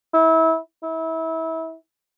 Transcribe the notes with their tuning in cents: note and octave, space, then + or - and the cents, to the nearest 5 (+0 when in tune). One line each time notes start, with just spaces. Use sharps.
E4 -30
E4 -30